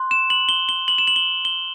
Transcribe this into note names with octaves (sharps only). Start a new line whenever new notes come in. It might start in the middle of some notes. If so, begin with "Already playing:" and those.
Already playing: C6 F#6
E7
F#7
G7
G7
F#7
E7
F#7
G7
G7